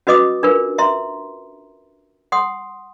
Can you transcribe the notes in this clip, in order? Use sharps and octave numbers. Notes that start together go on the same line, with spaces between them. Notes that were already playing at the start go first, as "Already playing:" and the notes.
C#4 F#4 B4 D#5 D6 D#6
D4 F4 A#4 B4
E5 A#5 C6
F#5 C6 D#6